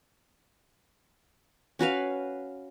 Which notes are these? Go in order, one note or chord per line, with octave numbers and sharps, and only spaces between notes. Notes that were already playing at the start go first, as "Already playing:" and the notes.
C#4 F#4 B4 F5